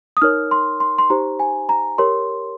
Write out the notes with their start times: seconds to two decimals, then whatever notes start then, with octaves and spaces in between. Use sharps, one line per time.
0.17 D#6
0.22 D#4 A#4 C#5 F6
0.51 C6
0.80 C6
0.98 C6
1.10 D#4 G4 C5 A#5
1.40 G#5
1.69 A#5
1.98 G4 A#4 C#5 C6